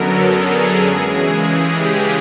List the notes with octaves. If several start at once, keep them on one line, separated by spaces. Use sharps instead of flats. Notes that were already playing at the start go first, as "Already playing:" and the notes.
Already playing: F#2 D3 F#3 B3 A4 A#4
G#4
C#3 E3 G#3
G4